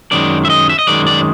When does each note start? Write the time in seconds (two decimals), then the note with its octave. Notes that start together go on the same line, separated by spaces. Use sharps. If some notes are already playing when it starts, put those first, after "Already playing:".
0.12 F#2 D#3 G#3 D5
0.45 E5
0.50 D#5
0.69 E5
0.79 D#5
0.87 F#2 D#3 G#3 D5
1.07 D5